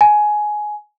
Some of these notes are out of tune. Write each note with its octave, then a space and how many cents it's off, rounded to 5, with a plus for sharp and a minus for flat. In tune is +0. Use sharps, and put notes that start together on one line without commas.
G#5 +15